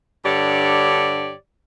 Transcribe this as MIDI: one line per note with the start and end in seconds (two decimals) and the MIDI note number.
0.25 1.34 43
0.25 1.34 50
0.25 1.34 67
0.25 1.34 73
0.25 1.34 74